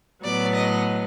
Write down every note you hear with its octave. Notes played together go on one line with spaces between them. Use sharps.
A2 F#3 B3 D5
D#5